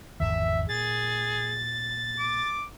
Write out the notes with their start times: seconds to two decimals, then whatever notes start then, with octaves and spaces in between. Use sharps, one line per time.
0.20 G#1 E2 D3 E5
0.69 A#2 G#4 A6
2.19 D6